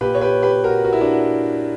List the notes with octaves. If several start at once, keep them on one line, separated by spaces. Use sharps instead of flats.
A#2 G4 B4
C#5
G4 B4
G4 B4
F#4 A#4
F#4
E4
D4 F#4